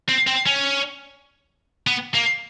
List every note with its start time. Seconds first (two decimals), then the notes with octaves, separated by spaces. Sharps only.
0.09 C4
0.27 C4
0.47 C#4
1.87 B3
2.14 A#3